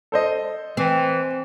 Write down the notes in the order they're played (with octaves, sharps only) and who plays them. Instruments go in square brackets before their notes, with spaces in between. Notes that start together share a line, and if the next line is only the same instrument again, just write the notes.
[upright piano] A4 C5 D#5
[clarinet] E3 [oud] C4